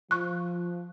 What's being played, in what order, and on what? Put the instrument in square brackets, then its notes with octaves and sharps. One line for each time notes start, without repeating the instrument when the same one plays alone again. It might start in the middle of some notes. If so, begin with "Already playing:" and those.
[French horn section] F3 [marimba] C#6 F#6